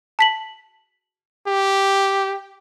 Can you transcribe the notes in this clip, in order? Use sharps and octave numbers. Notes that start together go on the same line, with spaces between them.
A5 B6 F#7
G4